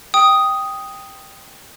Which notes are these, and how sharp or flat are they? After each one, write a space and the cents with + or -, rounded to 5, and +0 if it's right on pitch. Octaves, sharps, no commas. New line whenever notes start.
G5 +0 D#6 +0